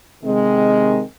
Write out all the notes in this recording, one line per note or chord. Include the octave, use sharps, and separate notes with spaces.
C3 D#3 G#3